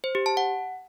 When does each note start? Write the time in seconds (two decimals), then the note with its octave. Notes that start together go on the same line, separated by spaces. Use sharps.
0.04 C5
0.15 G4
0.26 A5
0.37 F#5